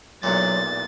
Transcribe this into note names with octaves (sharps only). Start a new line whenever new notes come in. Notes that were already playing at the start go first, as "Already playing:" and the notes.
B1 E2 A#2 F#3 A6